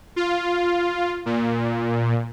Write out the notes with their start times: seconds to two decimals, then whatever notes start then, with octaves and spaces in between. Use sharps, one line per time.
0.16 F4
1.26 A#2